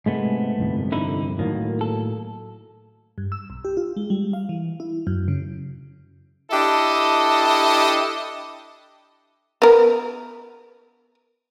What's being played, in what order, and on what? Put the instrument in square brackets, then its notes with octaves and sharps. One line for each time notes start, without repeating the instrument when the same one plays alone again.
[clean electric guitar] G#2 A3 B3 [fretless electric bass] C3 G#3
[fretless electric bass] G1 C2 F2
[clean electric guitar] D3 D#4 E4
[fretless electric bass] A2 F#3 A#3 [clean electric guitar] D#3
[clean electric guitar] A4
[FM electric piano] G2
E6
B1
G4
F4
G#3
G3
F5
E3
E4
F#2
C#3
[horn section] D4 E4 G4 A4 D#5
[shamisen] B3 A#4